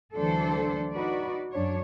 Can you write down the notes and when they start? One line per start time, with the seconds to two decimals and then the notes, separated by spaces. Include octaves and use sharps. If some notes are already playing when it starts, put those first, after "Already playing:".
0.16 D2 E3 F#3 D4 A4 C5
0.93 D#4 F#4 B4 D5
1.52 F#2 F#3 D4 C#5